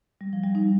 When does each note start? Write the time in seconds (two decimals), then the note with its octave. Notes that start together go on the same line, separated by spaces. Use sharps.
0.21 G3
0.33 F3
0.44 G3
0.55 D#4